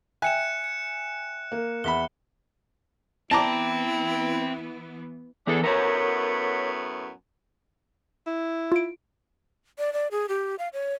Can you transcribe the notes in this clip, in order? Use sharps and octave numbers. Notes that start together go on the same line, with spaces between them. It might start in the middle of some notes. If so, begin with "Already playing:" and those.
E5 G5 G#5 F#6 C#7 E7
C#7
A#3
E2 E5 B5 G7
E3 B3 C4 E4 G5 A5 A#5 D6
E3 B3 D4 G#4 A4
F#2 A2 B3 A#4 C#5
E4
F4 D7
D5
D5
G#4
G4
F5
C#5